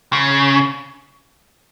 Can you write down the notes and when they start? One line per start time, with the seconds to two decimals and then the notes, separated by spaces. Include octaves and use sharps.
0.13 C#3